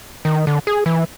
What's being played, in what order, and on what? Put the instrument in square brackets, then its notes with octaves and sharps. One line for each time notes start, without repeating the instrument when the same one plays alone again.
[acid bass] D#3
D3
G#4
E3